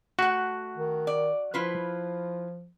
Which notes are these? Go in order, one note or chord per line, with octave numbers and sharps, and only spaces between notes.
A3 F#4 F#5
D#3
D5
F3 E4 F4 B4